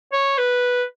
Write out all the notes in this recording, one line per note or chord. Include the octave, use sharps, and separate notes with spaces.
C#5
B4